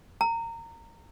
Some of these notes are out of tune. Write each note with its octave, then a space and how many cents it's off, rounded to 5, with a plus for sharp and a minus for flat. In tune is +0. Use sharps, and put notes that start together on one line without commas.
A#5 -20